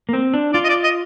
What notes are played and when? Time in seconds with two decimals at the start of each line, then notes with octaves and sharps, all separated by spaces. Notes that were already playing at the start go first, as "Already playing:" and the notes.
0.09 A#3
0.13 C4
0.34 D4
0.54 F4 D5
0.64 D#5
0.69 D5
0.84 D#5